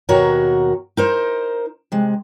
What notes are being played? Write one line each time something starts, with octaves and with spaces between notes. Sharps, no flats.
D#2 B2 F#4 A#4 C#5 A#5
D#4 A#4 C5
C3 G#3